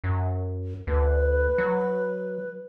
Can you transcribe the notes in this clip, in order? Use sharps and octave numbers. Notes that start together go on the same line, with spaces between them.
F#2
D2 B4
F#3